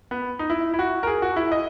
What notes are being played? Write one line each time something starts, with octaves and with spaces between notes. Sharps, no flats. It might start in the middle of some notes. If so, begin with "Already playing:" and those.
B3
D#4
E4
E4
F#4
A#4
G#4
F#4
E4
D#5